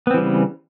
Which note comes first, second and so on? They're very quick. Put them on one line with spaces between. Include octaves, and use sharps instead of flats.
B3 C4 E3 G3 C#3